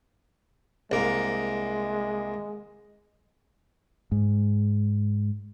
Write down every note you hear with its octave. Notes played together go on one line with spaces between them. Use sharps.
C2 G#3 A#3
G#2